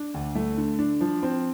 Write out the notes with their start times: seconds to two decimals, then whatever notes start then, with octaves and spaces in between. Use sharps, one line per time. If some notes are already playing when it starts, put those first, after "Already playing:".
Already playing: D4
0.14 D2
0.35 A3
0.58 D3
0.79 D4
1.01 F3
1.23 C4